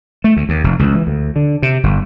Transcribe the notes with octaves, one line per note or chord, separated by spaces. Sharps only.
A3
D2
D#2
F1
C#2
E3
D2
D3
C3
G1